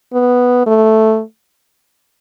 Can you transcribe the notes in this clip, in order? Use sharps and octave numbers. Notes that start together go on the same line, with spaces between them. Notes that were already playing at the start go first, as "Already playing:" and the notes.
B3
A3